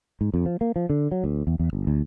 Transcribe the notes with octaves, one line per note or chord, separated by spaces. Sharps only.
G#2
F2
F3
A#3
F3
D3
F#3
D2
E2
E2
G1
D2